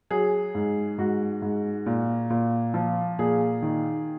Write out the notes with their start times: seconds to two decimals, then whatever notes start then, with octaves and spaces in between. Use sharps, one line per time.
0.11 F#3 G#4
0.55 G#2
0.98 G#2 F#4
1.42 G#2
1.86 A#2
2.30 A#2
2.74 F3
3.19 A#2 G#4
3.62 D#3